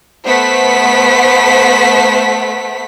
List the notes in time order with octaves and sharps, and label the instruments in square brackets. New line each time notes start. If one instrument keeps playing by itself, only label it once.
[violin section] A3 B3 C5 F#5 B6